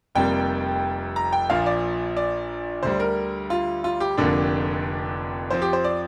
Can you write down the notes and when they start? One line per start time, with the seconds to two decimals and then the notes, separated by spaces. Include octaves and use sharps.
0.15 F1 F2 C3 G3 A#3 G5
1.16 A#5
1.33 G5
1.49 A#1 A#2 F3 F5
1.66 D5
2.17 D5
2.83 D2 D3 G3 C5
3.00 A#4
3.50 F4
3.84 F4
4.00 G4
4.17 F1 F2 D3 A#3 D4 G4
5.50 F2 F3 C4 C5
5.62 G4
5.73 C5
5.84 D5